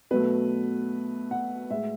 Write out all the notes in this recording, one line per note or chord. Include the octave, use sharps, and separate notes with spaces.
B2 F#3 A3 B4
F#5
A2 G#3 E5